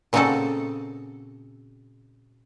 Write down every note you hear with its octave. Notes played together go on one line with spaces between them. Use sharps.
A#2 C#3 C4 D#4 F#4 A4